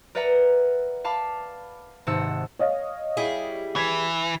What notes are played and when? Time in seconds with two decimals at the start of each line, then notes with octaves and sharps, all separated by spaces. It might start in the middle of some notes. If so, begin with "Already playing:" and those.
0.15 A#4 B4 D5 E5 F#5 A#5
1.04 F5 A5 B5 D6
2.07 G#1 G#2 C3 F#5 A5 E6
2.59 C#5 D#5 F5
3.17 G3 E4 G#4
3.76 E3 G#6 B6